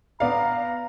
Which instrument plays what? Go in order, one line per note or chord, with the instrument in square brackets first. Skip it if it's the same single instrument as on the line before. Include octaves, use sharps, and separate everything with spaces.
[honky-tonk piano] B3 D5 F5 [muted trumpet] A#5